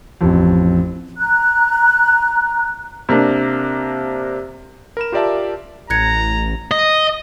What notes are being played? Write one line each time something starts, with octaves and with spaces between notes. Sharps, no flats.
A1 F2
A#5 F#6
C3 A#3 D4
A#4 B5 E7
F4 G4 A#4 D5 E5 A5
A1 A#5 F#6 G#6 C#7
D#5